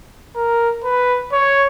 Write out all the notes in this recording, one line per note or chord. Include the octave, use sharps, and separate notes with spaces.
A#4
B4
C#5